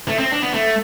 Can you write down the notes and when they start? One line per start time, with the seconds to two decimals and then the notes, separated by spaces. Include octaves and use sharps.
0.08 A3
0.19 C4
0.32 D4
0.42 B3
0.54 A3